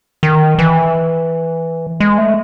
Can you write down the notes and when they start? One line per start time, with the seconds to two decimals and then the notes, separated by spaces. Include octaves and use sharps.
0.23 D#3
0.59 E3
2.00 G#3
2.18 A3